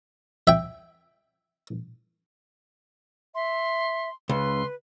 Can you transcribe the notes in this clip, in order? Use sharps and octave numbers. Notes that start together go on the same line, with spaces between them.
E5 G5
E5 C6
C#2 B4 C6